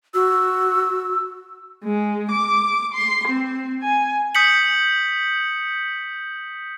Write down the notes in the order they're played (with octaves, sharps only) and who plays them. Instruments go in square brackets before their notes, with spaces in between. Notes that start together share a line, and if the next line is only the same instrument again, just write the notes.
[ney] F#4 [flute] E6
[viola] G#3
D6
C6
C4
G#5
[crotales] D#6 G6 B6 C#7 F#7